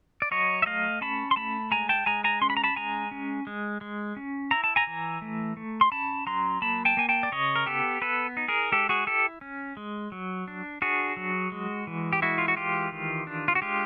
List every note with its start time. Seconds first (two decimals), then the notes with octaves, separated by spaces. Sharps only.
0.22 D5
0.31 F#3 C#5 D#5
0.62 E5
0.66 A3 D#5 F5
1.01 C#4 A5 B5
1.31 C6
1.36 A3 A5 B5
1.71 G#3 G#5 A#5
1.89 G5 A5
2.06 G#3 G#5 A#5
2.24 G#5 A#5
2.41 C#4 C6
2.50 B5
2.57 A#5
2.64 A5 B5
2.76 G#3 G#5 A#5
3.11 C#4
3.47 G#3
3.81 G#3
4.16 C#4
4.51 E4 A#5
4.64 A5
4.76 G#5 A#5
4.87 E3
5.22 A3
5.57 A3
5.81 C6
5.92 C#4 A5 B5
6.27 F#3 A#5 C6
6.62 A#3 A5 B5
6.85 G5 A5
6.97 A#3 G#5
7.09 G5 A5
7.23 D5
7.32 C#3 C#5 D#5
7.56 A#4
7.66 B3 G4 A4
8.01 B3 A4 B4
8.37 D#4
8.48 G#4 A#4
8.72 G#3 G4 A4
8.89 F#4 G#4
9.07 E4 G4 A4
9.41 C#4
9.77 G#3
10.12 F#3
10.48 D4
10.82 D4 F#4 G#4
11.17 F#3
11.52 G#3
11.87 E3
12.13 G4
12.22 G#3 E4 F#4
12.38 F4
12.48 F#4
12.57 E3 F4 G4
12.92 D#3
13.27 D4
13.48 F4
13.55 F#4
13.62 G#3 F4 G4